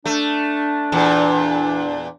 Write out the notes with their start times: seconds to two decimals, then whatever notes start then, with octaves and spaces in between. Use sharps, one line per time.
0.05 A3 D4
0.92 E2 A#2